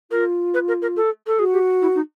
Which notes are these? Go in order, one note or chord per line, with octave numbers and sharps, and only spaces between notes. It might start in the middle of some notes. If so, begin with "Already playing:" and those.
F4 A#4
B4
A#4
A#4
A4
A4
F#4 G#4
G4
E4
D#4